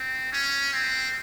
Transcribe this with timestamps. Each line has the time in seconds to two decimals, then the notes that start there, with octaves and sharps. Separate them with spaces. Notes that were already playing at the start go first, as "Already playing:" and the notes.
Already playing: C4
0.32 C#4
0.73 C4